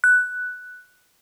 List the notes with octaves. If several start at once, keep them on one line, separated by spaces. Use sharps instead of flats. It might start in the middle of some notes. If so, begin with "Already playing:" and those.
F#6